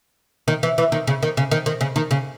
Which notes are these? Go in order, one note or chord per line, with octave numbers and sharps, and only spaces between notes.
D#3
E3
E3
D#3
C#3
D#3
C#3
D#3
D#3
C#3
D#3
C#3